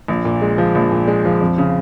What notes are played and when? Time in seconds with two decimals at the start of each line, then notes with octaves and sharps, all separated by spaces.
0.08 A#1
0.25 A#2
0.42 G#3
0.58 F3
0.75 A#1
0.92 A#2
1.07 G#3
1.25 F3
1.41 F2
1.58 C#3